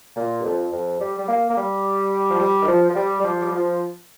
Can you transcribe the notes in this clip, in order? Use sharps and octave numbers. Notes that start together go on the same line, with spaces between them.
A#2
G2
F2
F2
G3
G3
A#3
A#3
G3
F3
G3
D#3
F3
F3
G3
G3
F3
G3
F3